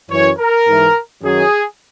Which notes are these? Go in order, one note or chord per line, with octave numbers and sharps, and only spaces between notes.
F#2 E3 C#5
A#4
G#2 E3
F#2 D#3 F#3 G#4